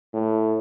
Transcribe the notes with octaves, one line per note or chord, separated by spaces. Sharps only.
A2